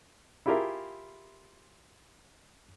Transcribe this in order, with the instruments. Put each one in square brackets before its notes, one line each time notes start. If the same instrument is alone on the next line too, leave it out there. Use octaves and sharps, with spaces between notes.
[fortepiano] E4 F4 G4 G#4 A#4 E5